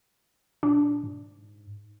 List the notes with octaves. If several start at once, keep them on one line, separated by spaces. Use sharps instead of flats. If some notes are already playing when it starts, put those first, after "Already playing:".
A#2 D4
G#2